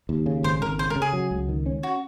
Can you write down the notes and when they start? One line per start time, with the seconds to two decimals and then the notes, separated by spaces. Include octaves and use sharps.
0.09 D#2
0.26 C#3
0.43 G#1 C5
0.61 G#1 A#4
0.79 C#3 C5
0.90 A#4
0.96 C#3
1.02 G#4
1.13 F#3
1.31 C#2
1.49 D#3
1.66 C#4
1.83 F#4